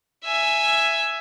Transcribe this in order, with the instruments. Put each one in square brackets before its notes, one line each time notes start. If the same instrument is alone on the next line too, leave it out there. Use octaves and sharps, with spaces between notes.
[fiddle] E5 G#5